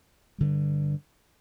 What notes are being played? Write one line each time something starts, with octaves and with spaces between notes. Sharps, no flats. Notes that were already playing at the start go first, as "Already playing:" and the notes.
G2 D3 G3